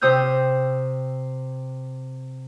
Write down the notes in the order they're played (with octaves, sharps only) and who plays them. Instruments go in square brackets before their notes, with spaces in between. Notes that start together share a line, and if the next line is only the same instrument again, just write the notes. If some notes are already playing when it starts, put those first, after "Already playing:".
[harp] C3 C5 D#6 E6 G6